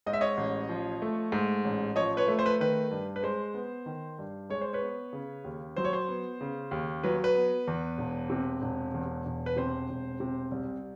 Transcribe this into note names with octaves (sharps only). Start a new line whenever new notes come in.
G#2 D#5
E5
C#5 D#5
A1
F3
A3
G#2
A1
F3 C#5 D#5
B4 C#5
A3
C5
B4
D#3 B4
G2
B4
G#3 C5
B3
D#3
G2
G#3 C#5
C5
B4 C#5
B3
C#3
D#2
F#3 C5
C#5
C5
B3
C#3
D#2
F#3 B4
B4
B3
E2
E1
C3
E1
E2
E1
B4
C3 C5
E1
C3
C2